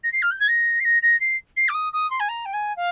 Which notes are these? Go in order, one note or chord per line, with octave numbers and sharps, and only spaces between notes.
A#6
C7
F6
G6
G#6
A#6
C7
A#6
A#6
C7
C7
D6
D#6
D#6
C6
G#5
A#5
G5
G#5
F5